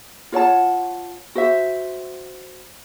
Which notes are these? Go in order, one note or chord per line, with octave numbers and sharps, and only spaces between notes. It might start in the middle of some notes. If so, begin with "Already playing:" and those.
F4 C#5 F#5 A5
F#4 C5 E5